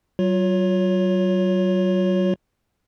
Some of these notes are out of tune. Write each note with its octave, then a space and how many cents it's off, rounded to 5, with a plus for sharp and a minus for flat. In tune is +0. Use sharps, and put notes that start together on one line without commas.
F#3 +35 F4 +30 C#5 +5